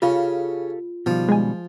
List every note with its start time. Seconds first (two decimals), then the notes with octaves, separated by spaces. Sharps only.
0.02 C#3 F4 G4 A4 F5
1.06 B2 D#3 F3 G3
1.29 G#3 G#5